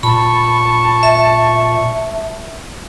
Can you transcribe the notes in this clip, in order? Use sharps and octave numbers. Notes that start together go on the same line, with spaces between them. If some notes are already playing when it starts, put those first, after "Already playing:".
A#2 A5 B5 C#6
E5